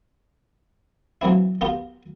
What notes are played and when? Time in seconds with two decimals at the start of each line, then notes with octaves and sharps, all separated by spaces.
1.21 E3 F#3 A#3 C4 E4
1.61 B3 F4 G4 A#4